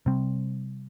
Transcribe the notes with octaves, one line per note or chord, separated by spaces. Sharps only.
C3 G3 C4